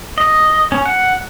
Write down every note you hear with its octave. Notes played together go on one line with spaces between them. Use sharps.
D#5
C#4
F#5